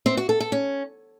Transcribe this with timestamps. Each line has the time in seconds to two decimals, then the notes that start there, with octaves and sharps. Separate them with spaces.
0.06 C4
0.17 F#4
0.29 A4
0.40 A4
0.52 C#4